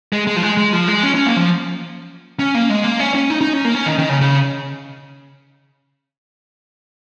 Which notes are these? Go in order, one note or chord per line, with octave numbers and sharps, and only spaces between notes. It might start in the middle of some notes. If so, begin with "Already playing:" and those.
G#3
G#3
F3
G#3
G#3
F3
G#3
C#4
C#4
A#3
F3
C#4
A#3
G#3
A#3
C#4
C#4
D#4
D#4
C#4
A#3
C#4
D#3
D#3
C#3
C#3